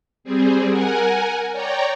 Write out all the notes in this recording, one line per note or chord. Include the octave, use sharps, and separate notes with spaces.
G3 C4 G#4
A#4 F#5 G#5
C#5 D5 G5 A#5